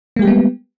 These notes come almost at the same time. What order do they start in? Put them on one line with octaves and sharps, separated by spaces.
A#3 G#3 G4 G3 B3